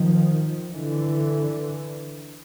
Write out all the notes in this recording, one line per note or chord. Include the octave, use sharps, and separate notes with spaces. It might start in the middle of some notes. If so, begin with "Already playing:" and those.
Already playing: D#3 F3
D3 E3